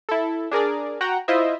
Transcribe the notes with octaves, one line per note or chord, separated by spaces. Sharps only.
E4 A4
D4 G#4 A#4 D5
F#4 F#5 G5 A#5
E4 F4 C5 D#5 E5